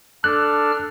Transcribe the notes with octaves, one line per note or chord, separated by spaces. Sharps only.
D4 A4 F6 F#6